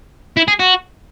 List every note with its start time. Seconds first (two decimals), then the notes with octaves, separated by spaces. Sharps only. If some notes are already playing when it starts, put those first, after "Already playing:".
0.37 E4
0.48 G#4
0.60 F#4